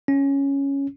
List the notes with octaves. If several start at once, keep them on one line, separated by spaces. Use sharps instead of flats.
C#4